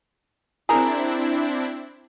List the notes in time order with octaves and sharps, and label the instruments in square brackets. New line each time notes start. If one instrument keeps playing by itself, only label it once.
[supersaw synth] C4 D4 E4 [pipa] G#4 A#4